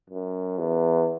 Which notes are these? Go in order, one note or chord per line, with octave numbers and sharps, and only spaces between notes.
F#2
E2